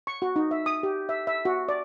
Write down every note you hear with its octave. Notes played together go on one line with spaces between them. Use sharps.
C#6
F#4
D#4
E5
D#6
G4
E5
E5
F#4
D5